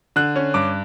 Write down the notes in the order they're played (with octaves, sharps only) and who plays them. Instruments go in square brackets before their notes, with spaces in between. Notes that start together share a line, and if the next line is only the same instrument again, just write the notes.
[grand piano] D3 F#6
C#4
G2 D6